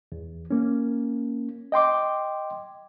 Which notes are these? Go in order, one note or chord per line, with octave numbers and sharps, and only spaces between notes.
E2
A#3 C#4
D#5 G5 C6 D6